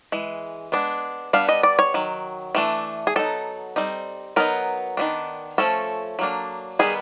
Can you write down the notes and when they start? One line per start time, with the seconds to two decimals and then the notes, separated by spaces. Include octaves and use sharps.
0.12 E3 G#3
0.72 G#3 B3 D4
1.33 G3 B3 D4 F5
1.49 D#5
1.63 D5
1.79 C#5
1.94 D#3 F#3
2.55 E3 A3 D4
3.07 G#4
3.16 F#3 B3 D#4 A4
3.76 G3 C4 D#4
4.36 F#3 B3 D#4 A#4
4.97 D#3 F#3 B3 D4
5.58 F3 A3 C#4 A4
6.19 F#3 A#3 D4
6.79 D#3 G3 B3 G#4